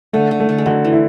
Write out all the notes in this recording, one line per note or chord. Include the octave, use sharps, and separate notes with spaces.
D3 A3
D3
A3
D3
G#3
D3 F#3
E3
E4